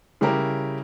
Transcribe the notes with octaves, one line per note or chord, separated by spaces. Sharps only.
C#3 G3 C#4 E4 G4 A#4